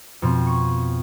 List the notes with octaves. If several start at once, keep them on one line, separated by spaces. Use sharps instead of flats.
F2 B2 C4
C#6